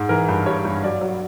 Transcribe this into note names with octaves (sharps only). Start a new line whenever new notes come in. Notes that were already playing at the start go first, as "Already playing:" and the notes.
Already playing: G#2
E3 A#4
G2
G3 C#5
G2
F#3 D5
F#3